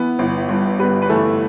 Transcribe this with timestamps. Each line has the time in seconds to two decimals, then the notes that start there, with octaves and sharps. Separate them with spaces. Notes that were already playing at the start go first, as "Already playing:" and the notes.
Already playing: E3 B3 B4
0.19 G1
0.49 G2
0.79 G3 B3 B4
1.02 B4
1.09 E3 A3 A4